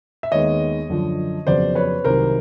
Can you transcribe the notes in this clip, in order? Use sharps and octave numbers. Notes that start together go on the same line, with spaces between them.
E5
D#2 D#3 G#3 B3 C#5 D#5
F#2 D3 F3
F2 C#3 F#3 B3 C5 D5
B4 C#5
C2 C3 D#3 F#3 A#4 C5